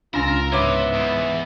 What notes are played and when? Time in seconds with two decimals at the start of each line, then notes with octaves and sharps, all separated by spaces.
0.14 C#2 C#4 D4 F4 A#4 A#5 E6
0.52 G#2 C3 B3 D#4 C#5 E5 D6
0.94 E2